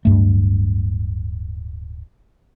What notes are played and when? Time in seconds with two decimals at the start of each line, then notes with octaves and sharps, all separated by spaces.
0.05 D1 G2 A3